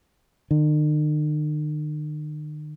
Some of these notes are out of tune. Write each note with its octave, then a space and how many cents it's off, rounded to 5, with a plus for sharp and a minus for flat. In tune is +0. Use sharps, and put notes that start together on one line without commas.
D#3 -45